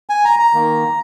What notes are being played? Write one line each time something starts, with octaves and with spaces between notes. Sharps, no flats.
G#5
A#5
A#5
D#3 A#3